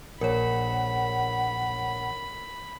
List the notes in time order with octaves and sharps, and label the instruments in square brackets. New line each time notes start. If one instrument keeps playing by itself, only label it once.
[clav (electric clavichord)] A#1 [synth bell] A#4 C#5 [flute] F#5 [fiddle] B5